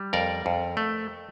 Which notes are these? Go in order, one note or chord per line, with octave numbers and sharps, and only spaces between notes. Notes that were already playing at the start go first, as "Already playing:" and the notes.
Already playing: G3
F2 A#4 D5
F2
A3